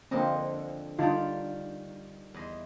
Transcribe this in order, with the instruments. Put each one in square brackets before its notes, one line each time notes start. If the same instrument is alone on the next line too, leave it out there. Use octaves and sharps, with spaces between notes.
[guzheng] D3 F3 D#5 [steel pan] A#3 C4
[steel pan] D3 D#4 F4 [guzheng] D#3 G3 D5
[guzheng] E2 D#5 C6